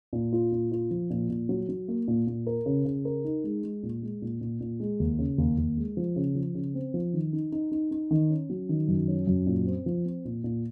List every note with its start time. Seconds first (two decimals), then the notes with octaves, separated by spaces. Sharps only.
0.13 A#2
0.33 F4
0.52 A#2
0.72 F4
0.91 F3
1.10 A#2
1.29 A#2
1.49 F#3
1.69 F#3
1.88 A#3
2.08 A#2
2.27 A#2
2.46 A#4
2.66 C#3
2.85 C#3
3.05 A#4
3.25 D#4
3.44 G#3
3.64 G#3
3.83 A#2
4.02 G#3
4.22 A#2
4.41 A#2
4.60 A#2
4.80 G#3
5.00 D#2
5.19 C#3
5.38 D#2
5.58 D#2
5.77 G#3
5.97 F3
6.16 C#3
6.35 F3
6.55 C#3
6.74 C4
6.94 F3
7.13 D#3
7.33 D#4
7.52 D#4
7.72 D#4
7.91 D#4
8.11 D#3
8.30 C#4
8.50 F#3
8.69 D#3
8.88 F#2
9.08 C#4
9.27 F#2
9.46 A#2
9.66 C4
9.86 F3
10.05 C4
10.25 A#2
10.44 A#2